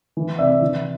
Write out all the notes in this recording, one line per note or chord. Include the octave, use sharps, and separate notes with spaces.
E3
C3 D5 E5
E3